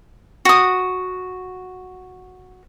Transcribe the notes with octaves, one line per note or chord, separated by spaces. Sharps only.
F#4 D#6